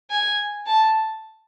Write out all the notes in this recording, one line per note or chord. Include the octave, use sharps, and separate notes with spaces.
G#5
A5